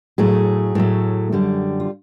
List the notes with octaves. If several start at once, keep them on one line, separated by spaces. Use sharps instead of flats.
A2 F#3 A3 G#4
A2 F#3 A3
F#2 D3 G3
F4